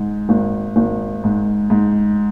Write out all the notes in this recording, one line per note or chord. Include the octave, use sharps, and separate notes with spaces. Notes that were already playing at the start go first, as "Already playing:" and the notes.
Already playing: G#2
G#1
G#1
G#2
G#2